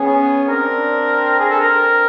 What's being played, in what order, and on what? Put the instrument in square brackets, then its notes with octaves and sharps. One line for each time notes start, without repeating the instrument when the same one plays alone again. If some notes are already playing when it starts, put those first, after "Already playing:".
Already playing: [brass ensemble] B3 C#4 [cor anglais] G#4
[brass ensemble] C4 D4 [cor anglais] A#4
[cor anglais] G#4
A4
[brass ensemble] C4 D4 [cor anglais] A#4